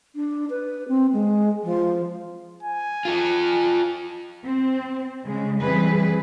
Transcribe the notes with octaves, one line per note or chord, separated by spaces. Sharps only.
D4
B4
C4
G#3
F3
G#5
F4 A4
C4
C#3 G#3
E3 G3 C4 G#4 B4